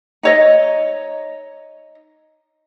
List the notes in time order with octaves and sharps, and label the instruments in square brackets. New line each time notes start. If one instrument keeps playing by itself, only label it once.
[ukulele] D#4 C#5 D#5